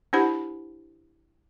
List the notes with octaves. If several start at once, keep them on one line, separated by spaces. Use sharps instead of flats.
D4 E4 G4 C5 F#5 B5